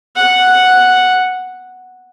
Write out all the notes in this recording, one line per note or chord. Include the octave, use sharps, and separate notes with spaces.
F#5